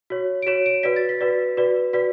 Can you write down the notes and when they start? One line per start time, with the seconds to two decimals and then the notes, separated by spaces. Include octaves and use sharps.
0.10 F#4 C#5
0.42 D7
0.47 F#4 C#5 E7
0.66 D7
0.83 F#4 B4 D5 B6
0.96 A6
1.09 B6
1.21 F#4 B4 D5
1.57 F#4 B4 D5
1.93 F#4 B4 D5 B6